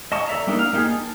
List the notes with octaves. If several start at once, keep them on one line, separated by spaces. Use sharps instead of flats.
D#5 A5 C#6
A4 D5 E5 A#5
G3 A#3 D4 D#4
F5
A#3 D#4 G4 G#4
A5